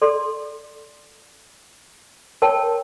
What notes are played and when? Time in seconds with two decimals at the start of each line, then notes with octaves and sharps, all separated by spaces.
0.02 A4 D5 C6
2.42 A#4 C#5 G5 A5